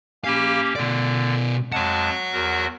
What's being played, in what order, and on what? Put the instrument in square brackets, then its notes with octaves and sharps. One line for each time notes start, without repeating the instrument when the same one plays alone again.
[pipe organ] A#3 C#4 G4 [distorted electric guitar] F5 B5
[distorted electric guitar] B2 D5 [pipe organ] D3
[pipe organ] F2 G#3 A5 [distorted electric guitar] C#5 F#5
[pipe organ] E2 F#4 A#4